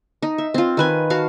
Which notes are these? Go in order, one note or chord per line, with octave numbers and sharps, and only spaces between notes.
D#4
E5
C4 F4
D#3 B4 G#5
F#4 F5 A5